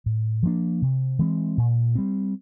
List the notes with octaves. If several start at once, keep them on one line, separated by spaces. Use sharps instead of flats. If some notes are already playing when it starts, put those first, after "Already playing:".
A2
F3 A#3 D4
C3
E3 G#3 C4
A#2
G3 C4